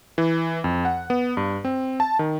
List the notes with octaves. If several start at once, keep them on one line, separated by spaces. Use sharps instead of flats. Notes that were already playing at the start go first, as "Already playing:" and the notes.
E3
F2
F#5
B3
G2
C4
A5
D#3